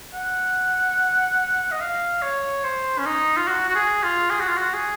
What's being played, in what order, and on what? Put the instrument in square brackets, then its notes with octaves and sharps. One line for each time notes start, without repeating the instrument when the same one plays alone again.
[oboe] F#5
D#5
F5
C#5
C5
C#4
D#4
F4
F#4
F#4
G#4
F4
G#4
F#4
F4
F#4
G#4